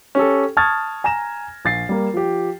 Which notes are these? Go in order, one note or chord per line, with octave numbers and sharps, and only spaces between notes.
C#4 G4 A4
A5 C#6 D#6 F6 G#6 A6
G#5 A#5 A#6 E7
A#1 A6 C7
G3 A#3
F3 G4